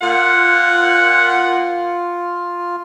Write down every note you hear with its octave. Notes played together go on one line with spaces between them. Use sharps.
A#2 F4 F#5